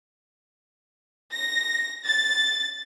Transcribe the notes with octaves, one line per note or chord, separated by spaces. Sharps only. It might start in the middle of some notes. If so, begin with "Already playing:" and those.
A#6
A6